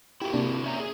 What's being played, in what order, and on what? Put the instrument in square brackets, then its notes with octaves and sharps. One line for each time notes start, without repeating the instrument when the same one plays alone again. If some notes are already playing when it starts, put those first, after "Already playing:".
[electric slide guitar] E4 F#4 A#4 [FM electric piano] G4
[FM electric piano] C3 A#3 D4
[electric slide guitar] C#4 E5 A#5
G#4